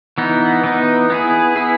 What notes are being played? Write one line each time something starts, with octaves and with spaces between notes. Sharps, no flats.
E3 B3 D#4
E3 B3 D#4
B3 E4 G#4
B3 E4 G#4